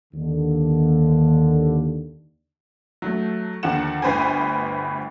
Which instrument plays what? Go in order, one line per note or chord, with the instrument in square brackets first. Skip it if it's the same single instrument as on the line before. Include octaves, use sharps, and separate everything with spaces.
[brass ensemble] D#2 D3
[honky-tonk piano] F#3 A3
D#2 D3 F3 F#5 E7
G1 D2 B4 C5 G5 G#5